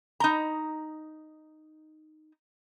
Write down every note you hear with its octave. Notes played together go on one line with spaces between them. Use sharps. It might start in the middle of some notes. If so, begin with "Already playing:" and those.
D#4 A#5